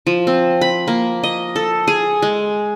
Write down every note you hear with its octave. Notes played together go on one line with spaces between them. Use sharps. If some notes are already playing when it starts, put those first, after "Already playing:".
F3
C4
B5
A#3
D#5
A4
G#4
G#3